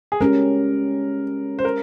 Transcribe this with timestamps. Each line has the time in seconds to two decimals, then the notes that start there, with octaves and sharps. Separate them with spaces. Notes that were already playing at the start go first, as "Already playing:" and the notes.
0.12 G#4
0.21 G#3 C#4 G4 A#4
1.59 C5
1.65 A#4